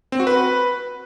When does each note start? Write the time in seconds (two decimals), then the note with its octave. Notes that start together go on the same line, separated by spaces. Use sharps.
0.12 C4
0.20 F#4
0.27 B4